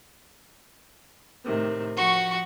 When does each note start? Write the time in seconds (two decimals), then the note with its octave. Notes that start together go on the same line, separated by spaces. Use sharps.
1.45 A2 C3 D#3
1.97 F3 F#4 C#6